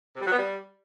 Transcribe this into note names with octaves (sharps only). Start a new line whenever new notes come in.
C3
G3
F#3
B3
G3